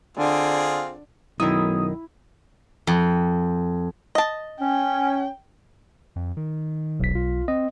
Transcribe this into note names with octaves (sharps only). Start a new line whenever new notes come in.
D3 C4 F4 G#4
B1 F#2 D#3 E4 D#6
F2
D#5 A5
C#4 G5
F2
D#3
D#1 B1 B6
F4
C4 D#5